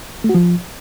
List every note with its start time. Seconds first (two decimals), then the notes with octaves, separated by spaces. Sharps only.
0.24 A3
0.29 F#4
0.35 F3